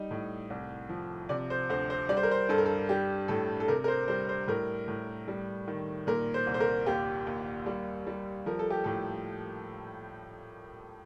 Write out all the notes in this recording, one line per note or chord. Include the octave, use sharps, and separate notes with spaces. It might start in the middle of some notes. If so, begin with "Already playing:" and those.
Already playing: G3 D#4
A2
C2
F3
C3 D5
C5
D2 C5
C5
G3 D5
C5
A#4
C5
G2 A4
A#4
A4
G3 G4
A2 A4
A4
C3 A#4
A#4
C5
G3 C5
C5
A2 A#4
A2
G3
D#3
A#2 A#4
C5
C2
C5
A#4
D#2 G4
D#2
G3
G3
F3 A#4
A4
G4
A2 A4